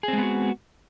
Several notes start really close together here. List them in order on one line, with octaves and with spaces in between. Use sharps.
G#4 C4 G#3 B3 F#4